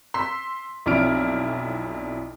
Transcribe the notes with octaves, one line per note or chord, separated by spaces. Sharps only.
C6 E6 B6
B1 F2 E4 D5 F6 D7